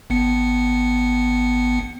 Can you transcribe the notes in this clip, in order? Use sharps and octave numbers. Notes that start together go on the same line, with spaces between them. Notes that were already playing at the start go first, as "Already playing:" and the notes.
G#1 B3 C#7